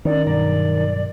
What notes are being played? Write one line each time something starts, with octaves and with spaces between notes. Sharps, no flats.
D#3 C#4 D#4 D5
B1 G2 D5 A#5